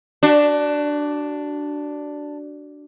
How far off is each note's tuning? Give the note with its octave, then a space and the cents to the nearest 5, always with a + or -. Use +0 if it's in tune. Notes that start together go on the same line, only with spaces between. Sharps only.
D4 +0 F#4 +25